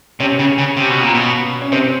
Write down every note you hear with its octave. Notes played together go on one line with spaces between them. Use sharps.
C3 C#4
C#3 C#4
C#3
C3
B2
A#2
B2
C#4
C3 C4